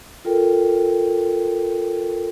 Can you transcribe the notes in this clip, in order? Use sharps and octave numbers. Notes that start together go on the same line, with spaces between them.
F4 A4 A#4 G5